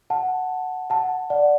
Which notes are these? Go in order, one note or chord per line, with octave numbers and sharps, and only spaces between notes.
F#5 A5
F#5 A5
D5 F#5